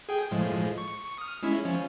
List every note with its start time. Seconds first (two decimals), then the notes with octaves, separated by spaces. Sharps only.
0.09 G#4 G5
0.31 A2 F3 G#3
0.78 C#6
1.18 D#6 F6
1.43 G#3 C#4 E4
1.65 F3 C#4